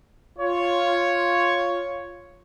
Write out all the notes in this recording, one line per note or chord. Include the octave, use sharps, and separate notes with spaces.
F4 C#5